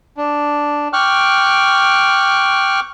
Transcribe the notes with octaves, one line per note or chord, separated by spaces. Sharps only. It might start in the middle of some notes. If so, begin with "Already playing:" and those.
D4
G5 C#6 D6 F6 F#6